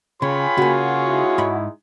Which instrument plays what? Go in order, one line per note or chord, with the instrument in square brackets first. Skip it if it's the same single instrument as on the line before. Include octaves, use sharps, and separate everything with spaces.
[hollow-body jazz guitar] C#3 [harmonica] F4 G#4 C#5 [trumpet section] G5 G#5 B5
[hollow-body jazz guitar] C#3 A#3 [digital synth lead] F#4
[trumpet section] G#3 D#4 E4
[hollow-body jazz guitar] G#2 B5